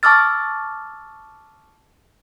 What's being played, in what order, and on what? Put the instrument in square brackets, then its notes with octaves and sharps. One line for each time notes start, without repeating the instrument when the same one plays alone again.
[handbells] A5 C#6 D6 E6 F6 A6